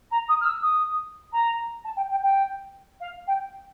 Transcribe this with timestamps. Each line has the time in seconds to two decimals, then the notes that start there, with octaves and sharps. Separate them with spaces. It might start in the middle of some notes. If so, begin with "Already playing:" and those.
0.11 A#5
0.29 D#6
0.41 F6
0.45 E6
0.62 D#6
1.32 A#5
1.84 A5
1.96 G5
2.10 G5
2.23 G5
3.00 F5
3.27 G5